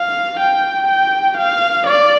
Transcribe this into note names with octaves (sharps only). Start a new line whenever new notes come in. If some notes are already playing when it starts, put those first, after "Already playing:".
Already playing: F5
G5
G5
F5
D5